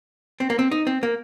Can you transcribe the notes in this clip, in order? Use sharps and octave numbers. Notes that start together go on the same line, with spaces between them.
C4
A#3
C4
D#4
C4
A#3